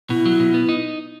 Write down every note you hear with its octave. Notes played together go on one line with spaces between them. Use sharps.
B2 E4
F#3
B2
B3
D#4